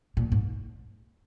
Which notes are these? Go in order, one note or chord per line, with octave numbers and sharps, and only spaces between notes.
A#2
G#2